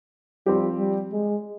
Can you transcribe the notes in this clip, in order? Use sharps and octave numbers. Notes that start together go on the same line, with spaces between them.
F3 G3 C4 G4
G3
G#3